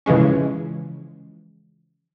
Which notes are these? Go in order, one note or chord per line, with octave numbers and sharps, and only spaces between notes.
C#3 E3 F3 G#3 C#4